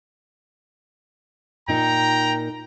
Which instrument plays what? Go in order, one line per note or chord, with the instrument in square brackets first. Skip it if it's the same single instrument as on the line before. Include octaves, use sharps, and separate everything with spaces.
[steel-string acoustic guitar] A#2 D#4 A#4 [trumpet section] G5 A#5